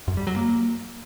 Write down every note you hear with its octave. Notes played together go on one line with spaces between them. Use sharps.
F#2
G3
F#3
A#3